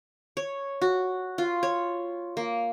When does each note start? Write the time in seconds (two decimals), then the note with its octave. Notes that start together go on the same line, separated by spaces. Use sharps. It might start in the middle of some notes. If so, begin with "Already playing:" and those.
0.37 C#5
0.82 F#4
1.38 F4
1.63 C#5
2.37 A#3